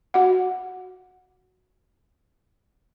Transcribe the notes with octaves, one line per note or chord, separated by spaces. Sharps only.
F#4 F#5